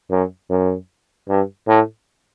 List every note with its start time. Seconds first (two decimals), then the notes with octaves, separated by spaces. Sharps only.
0.11 F#2
0.50 F#2
1.29 G2
1.68 A2